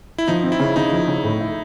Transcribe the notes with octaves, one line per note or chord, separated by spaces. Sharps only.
E4
F3 D#4
C4
E4
C#3
C#3 D#4
F3
C#3
A2
E4